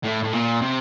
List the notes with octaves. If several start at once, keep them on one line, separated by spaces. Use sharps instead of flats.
A2
A2
A#2
C3